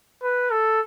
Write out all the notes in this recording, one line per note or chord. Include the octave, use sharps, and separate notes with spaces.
B4
A4